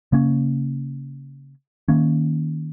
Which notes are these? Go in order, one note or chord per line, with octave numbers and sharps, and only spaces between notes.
C#3 A#3 C#4
D#3 A#3 C#4